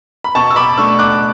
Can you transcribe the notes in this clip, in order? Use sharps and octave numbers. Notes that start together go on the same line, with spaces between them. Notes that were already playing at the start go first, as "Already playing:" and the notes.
B5
B2 A5 C#6
E6
B5 D6
A3 D4 C#6 E6
D6 F#6